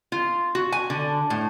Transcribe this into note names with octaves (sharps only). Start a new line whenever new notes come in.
F4
F#4
G#5
D3
A2